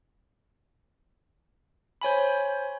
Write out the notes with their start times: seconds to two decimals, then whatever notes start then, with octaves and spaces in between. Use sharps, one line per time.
2.02 C5 C#5 G#5 B5